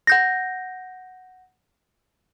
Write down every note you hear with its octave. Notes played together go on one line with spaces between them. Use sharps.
F#5 G6 A#6